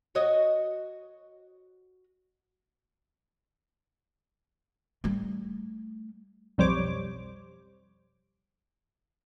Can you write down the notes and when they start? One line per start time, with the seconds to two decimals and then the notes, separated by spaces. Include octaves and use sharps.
0.15 F#4 C#5 D#5
5.04 G3 A3
6.58 B1 F2 G3 C5 C#5 D6